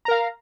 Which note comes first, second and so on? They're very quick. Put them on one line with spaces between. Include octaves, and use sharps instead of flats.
A#5 A#4 F5